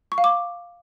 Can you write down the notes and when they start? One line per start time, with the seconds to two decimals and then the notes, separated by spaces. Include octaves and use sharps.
0.12 C#6
0.18 F5
0.24 D6